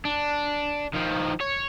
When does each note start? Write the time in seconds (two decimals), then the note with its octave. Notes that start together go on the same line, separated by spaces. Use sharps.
0.05 D4
0.94 D#3 F3
1.40 C#5